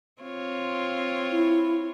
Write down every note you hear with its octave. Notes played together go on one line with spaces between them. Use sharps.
C4 F4 C#5
E4